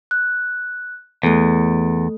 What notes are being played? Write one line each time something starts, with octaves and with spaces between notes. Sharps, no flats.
F#6
E2 A3 A4